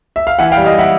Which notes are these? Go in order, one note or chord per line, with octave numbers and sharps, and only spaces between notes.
E5
F5
E3 E5 F#5
F5 G5
G3
D#5 F5
E5 F#5